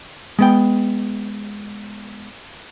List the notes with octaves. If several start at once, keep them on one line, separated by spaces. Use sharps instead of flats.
G#3 B3 G5